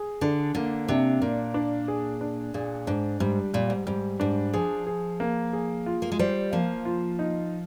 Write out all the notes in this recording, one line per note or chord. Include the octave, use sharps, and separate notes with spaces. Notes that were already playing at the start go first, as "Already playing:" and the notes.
Already playing: G#4
D3 D4
D3 A#3
C3 D4
A#2 A#3
D4
G#4
D4
A#2 G#4
G#2 D4
G#2 G3
A#2 G3
G#2
G#2 G3
G#2 D4
F3 G#4
G#4
A#3
G#4
F4
A#3
G#3
G3 C5
F3 A#3
F4
D#4